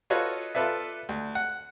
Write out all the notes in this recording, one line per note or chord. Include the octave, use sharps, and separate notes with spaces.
F4 F#4 A4 B4 C#5 D#5
F4 A4 B4 D5 E5
D2
F#5